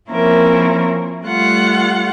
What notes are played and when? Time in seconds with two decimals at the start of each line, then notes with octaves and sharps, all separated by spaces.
0.10 F3 A#3 C4 C#4 E4 A#4
1.25 G3 A3 F4 F#5